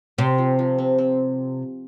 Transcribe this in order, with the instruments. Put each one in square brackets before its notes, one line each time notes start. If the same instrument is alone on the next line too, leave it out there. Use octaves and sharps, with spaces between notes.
[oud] C3 [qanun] C4
[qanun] F3
F3
C4
C4